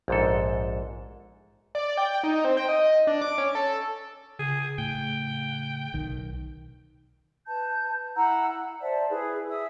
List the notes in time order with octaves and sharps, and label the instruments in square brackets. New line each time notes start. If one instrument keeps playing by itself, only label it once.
[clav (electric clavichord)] A#1 G#2 A4
[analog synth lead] D5
G5
D#4
C4
G5
D#5
D4
D6
C#4
A4
[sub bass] C#3 [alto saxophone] G#4
[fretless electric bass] A2 [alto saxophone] G5
[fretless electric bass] B1 D#3
[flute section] B4 A5 G6
E4 F#5 A#5 E6
F#5
C5 D5 E5 A5
E4 G#4 B4
E5 D#6 E6